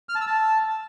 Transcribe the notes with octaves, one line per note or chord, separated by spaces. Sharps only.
F6
A5
E6
A5